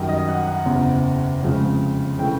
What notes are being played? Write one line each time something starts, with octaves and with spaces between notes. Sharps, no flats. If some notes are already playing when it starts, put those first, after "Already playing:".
Already playing: F#2 D#3 G3
D#5
F#5
F#5
F#1 E2 C#3
F1 F2 C#3 F3 G#3
C#3 E3 A3 G5